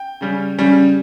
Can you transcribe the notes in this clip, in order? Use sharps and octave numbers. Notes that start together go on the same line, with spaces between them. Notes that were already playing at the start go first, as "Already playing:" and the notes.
Already playing: G5
C#3 G3 C#4
C#3 G3 C#4